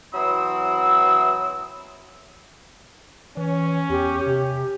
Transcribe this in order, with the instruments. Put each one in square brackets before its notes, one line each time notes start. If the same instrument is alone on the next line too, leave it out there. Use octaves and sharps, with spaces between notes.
[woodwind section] E3 F#3 C4 E4 D#6 E6
[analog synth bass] E3 [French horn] C#4
[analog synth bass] E2 [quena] G4
[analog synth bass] C3 [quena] G4